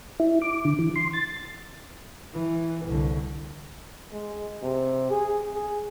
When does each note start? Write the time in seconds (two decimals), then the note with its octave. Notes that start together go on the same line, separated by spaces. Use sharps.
0.20 E4
0.42 D6
0.65 D3
0.79 E3
0.96 C6
1.13 A6
2.34 E3
2.85 C2 D3
4.12 G#3
4.63 C3
5.11 G#4
5.55 G#4